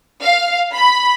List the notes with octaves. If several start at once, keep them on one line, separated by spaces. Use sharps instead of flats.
F5
B5